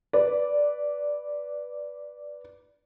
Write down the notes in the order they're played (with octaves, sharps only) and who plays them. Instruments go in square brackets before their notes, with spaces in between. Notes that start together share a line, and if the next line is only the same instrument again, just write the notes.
[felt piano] B4 D5